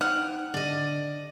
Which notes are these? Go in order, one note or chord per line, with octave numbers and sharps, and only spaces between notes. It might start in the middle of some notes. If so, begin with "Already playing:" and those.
D#4 C5 F#5 G5 F6
D3 D5 D#5